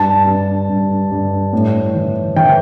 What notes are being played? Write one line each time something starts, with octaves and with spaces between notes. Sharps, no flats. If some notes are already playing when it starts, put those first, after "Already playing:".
Already playing: G2 A5
G2
G2
G2
A2
E3
E3 G5